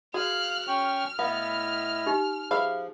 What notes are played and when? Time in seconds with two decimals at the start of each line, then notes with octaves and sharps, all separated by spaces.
0.14 F#4 G#4 F5 F6 F#6
0.67 C#4 G5 C#6 F6
1.19 A2 B3 E4 D#5 F5
2.06 D#4 G4
2.51 F3 G#4 B4 E5 F5